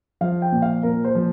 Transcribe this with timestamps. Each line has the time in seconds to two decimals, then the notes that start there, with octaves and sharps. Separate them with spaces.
0.21 F3 F5
0.42 G5
0.52 A#2
0.62 F5
0.83 A#2 A#4
1.05 C5
1.15 F3